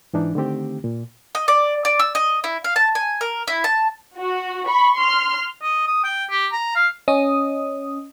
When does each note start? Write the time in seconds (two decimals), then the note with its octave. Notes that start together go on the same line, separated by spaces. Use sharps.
0.13 G#2 E3 D4 D#4
0.35 D3 D#3 A3 C4 G4
0.84 A#2
1.35 D#5
1.48 D5
1.85 D5
1.99 E6
2.15 D#5
2.44 E4
2.64 F5
2.76 A5
2.95 G#5
3.21 A#4
3.48 E4
3.64 A5
4.19 F#4
4.65 B5 C#6
4.97 C6 F6
5.63 D#5
5.87 D#6
6.04 G5
6.30 G4
6.52 A#5
6.75 F5
7.08 C#4 D#5 D#6